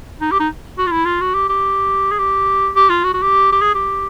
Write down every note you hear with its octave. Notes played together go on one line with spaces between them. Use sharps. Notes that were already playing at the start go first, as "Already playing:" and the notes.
D#4
G4
D#4
F#4
F4
E4
F4
F#4
G4
G4
G#4
G4
G4
F4
F#4
F#4
G4
G4
G#4
G4